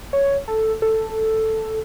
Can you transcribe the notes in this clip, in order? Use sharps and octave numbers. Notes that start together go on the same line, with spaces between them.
C#5
A4
A4